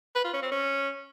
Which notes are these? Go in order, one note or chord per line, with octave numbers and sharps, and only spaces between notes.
B4
F4
C#4
C4
C#4